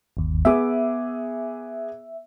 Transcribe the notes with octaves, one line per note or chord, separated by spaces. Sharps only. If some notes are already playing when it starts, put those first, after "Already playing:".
G1 D#2
B3 G#4 E5 D6